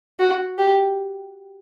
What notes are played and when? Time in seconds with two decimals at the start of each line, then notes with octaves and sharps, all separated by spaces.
0.19 F#4
0.58 G4